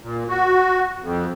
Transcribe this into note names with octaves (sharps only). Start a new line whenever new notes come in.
A#2
F#4
F2